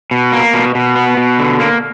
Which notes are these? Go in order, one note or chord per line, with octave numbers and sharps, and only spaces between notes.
B2
A#3
B2
B2
B3
B2
D3
A#3